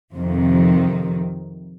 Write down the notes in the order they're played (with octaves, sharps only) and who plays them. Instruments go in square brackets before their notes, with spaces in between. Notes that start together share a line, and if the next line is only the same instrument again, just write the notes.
[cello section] F2 C3 D#3